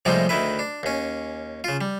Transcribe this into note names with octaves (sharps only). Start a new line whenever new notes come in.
A2 C3 F3 G3 G#3 D#4
D2 D#3 E4 B4
D4
D#2 C#4
C#3 F4
G3